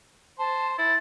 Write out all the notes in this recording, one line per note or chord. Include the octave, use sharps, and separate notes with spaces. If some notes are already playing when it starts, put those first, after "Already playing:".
C5 A5
E4 A6